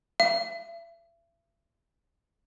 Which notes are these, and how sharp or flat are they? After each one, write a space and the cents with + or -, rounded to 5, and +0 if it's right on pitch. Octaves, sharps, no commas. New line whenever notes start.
E5 +40